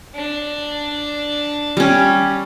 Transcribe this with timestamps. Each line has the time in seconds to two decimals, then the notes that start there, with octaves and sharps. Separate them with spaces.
0.15 D4
1.77 G3 C#4